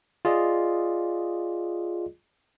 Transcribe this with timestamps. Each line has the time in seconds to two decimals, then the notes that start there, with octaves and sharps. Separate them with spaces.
0.25 F4 G#4 D5 D#5